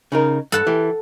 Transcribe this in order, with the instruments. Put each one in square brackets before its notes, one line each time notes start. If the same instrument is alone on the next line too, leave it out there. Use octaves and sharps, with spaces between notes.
[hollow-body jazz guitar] C#3 D#4 A#4
[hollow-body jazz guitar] G2 [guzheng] A4 F#5 A5
[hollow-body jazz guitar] E3 G4